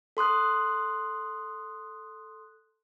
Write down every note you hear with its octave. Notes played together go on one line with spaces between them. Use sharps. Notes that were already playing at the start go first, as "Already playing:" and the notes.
A4 C6 D#6 F#6